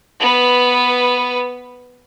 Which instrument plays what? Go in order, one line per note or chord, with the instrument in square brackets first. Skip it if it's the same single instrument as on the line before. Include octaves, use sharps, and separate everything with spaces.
[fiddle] B3 B4